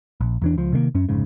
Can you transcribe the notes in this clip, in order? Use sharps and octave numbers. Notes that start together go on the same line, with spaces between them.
A#1
E2 E3 D4
C#2 F3
C3 D#3 G#3 A#3
F#2 C#4
F1 G#2 C#3